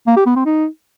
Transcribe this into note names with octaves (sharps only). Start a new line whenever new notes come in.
A#3
G4
B3
C4
D#4